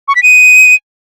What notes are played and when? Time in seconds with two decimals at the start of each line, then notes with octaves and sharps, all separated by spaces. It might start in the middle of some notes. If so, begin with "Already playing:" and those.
0.08 C#6
0.16 B6
0.23 D#7